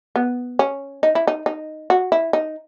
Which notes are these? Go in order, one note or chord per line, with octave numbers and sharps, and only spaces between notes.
B3
C#4
D#4
E4
D#4
D#4
F#4
E4
D#4